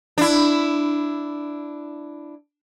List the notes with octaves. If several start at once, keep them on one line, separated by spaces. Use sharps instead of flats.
D4 E4